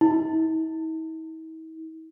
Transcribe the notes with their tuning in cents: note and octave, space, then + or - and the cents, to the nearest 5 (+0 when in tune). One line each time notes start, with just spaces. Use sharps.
E4 -45